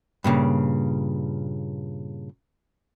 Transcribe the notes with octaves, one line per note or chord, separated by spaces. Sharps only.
G2 A#2 C#3